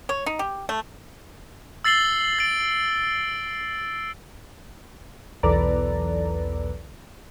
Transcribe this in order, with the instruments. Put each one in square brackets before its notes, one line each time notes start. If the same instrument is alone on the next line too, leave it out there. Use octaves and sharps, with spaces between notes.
[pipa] C#5
D#4
G4
A3
[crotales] E6 A6 C7 F#7 G7
A6 D7
[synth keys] B1 E2 A4 B4 D5 A#5